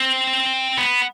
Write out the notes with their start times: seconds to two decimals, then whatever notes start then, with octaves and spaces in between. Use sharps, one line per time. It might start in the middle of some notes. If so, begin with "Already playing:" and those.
Already playing: C4
0.78 B3